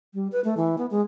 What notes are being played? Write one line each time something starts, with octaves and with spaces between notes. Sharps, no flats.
G3
B4
A3
E3
B3
G#3